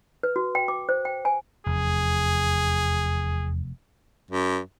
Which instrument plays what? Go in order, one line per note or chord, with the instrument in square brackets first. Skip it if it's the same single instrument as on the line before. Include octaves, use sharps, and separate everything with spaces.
[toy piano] B4
F#4
G5
D6
C5
G5
G#5
[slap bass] F1 [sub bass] E2 [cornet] G#4
[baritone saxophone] F#2